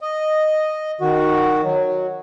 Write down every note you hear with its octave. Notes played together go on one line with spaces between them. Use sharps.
D#5
D#3 F#4
F#3